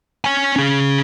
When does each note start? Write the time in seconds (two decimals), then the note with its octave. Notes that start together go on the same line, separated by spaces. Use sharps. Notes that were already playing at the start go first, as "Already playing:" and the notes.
0.24 C#5 G#5
0.56 C#4 G#4